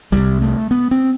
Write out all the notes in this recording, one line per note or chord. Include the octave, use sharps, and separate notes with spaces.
C2 C3 G3
A3
B3
C4